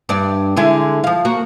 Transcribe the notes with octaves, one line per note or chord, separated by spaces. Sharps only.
G2 D5
D3 G#3 E4
F3 F5
A#3 F#4